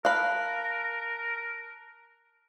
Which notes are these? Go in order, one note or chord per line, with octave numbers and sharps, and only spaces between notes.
A#4 F5 A5 B5 F6 F#6